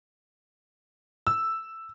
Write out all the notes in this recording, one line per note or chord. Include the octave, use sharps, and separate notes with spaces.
E6